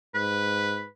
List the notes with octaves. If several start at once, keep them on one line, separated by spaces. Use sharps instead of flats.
G#2 B4